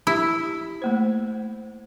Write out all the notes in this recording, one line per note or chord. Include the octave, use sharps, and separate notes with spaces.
E4 G4
A3 A#3 C5